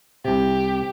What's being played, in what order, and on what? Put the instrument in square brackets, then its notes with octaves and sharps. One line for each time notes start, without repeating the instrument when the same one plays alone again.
[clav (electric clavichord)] C2 C3 [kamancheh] G4